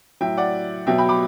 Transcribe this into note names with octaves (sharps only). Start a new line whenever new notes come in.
A2 F#3 E5 G5
D5 F#5
B2 F#3 E5 G5
G5 B5
B5 D6